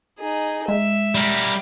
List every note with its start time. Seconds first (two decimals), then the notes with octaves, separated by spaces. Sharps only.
0.19 D#4 G#4
0.68 G#3 E5
1.15 G3 A#4